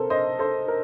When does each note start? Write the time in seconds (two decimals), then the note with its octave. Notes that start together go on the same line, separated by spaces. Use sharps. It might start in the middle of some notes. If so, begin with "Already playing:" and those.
Already playing: C3 A4 A#4 C5
0.10 C5 D#5
0.39 A4 C5
0.68 A#4